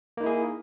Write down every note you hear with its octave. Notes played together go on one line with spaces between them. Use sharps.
A#3 D#4 E4 G#4